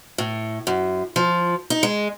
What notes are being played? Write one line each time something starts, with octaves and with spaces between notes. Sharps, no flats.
A2
F#2
F3
D#4
G#3